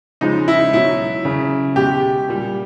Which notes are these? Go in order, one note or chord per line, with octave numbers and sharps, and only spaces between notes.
C#3 F3 G#3 D#4
E4
B2 F#3 E4
C#3 F#3
B2 G#3 G4
A#2 G3